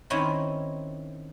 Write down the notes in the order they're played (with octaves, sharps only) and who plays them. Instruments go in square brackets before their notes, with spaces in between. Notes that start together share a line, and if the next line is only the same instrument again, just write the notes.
[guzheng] D#3 C4 C#4 E4 A#5